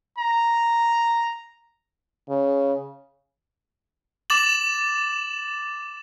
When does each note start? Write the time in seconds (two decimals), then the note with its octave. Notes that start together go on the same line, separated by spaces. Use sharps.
0.18 A#5
2.29 C#3
4.30 D6 A6 E7 F#7